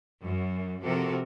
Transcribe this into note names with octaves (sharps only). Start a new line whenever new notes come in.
F#2
C3 F3 F#4 A4 A#4